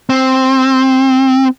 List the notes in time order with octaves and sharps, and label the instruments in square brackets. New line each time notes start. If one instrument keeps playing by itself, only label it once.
[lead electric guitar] C4